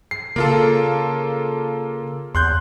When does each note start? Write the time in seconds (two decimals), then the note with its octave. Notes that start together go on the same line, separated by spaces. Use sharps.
0.11 C7
0.36 C#3 A#3 F4 A4
2.35 E2 C6 F#6 G6